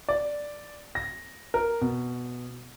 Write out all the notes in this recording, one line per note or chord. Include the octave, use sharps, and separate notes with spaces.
D5
A#6
A#4
B2